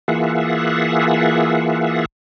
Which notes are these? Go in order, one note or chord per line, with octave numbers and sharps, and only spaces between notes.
E3 A#3 F4 G#4 E5 F#5